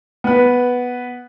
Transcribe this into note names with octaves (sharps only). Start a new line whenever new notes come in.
B3 B4